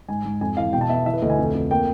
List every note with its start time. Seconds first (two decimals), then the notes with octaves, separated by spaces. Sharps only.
0.08 G#2 G#5
0.25 G#2
0.41 F2 G#5
0.57 E3 F5
0.73 B2 G5
0.81 A5
0.89 B3 E5
1.06 E3 E5
1.14 B4
1.22 D2 D#5
1.30 G#5
1.38 F2
1.55 F2
1.71 A#3 G5